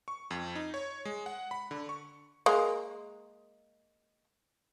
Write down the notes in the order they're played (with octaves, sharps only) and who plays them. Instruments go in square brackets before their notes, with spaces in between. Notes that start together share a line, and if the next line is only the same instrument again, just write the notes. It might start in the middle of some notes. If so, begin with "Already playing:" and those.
[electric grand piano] C#6
F2
D#4
C#5
G#3
F#5
B5
D3
C#6
[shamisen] G#3 A#3